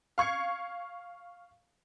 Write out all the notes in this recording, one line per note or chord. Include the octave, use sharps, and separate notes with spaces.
F5 C#6 G#6 C#7